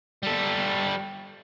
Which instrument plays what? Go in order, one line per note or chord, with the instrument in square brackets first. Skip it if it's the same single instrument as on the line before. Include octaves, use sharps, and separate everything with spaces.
[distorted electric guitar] G3 A4